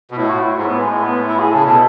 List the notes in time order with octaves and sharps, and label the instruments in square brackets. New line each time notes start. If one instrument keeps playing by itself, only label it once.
[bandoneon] B2
[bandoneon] A2 [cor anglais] E4
[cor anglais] F#4
E4
[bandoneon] G#2
[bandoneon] A2 [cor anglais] B3
[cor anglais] G#3
G#3
B3
E4
G#4
[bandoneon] C#3 [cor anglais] A4
[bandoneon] B2 [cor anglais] A4